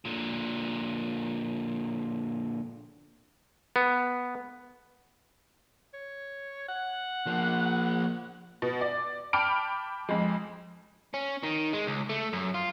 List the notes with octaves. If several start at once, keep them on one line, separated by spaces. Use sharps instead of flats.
A#2 D3
B3
C#5
F#5
F3 A#3
B2
D5
G5 A5 B5 D6 F6 D7
F2 G#3
C#4
D#3
G#3
C#2
A3
F#2
F4